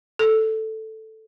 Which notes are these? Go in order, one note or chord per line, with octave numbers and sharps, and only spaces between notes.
A4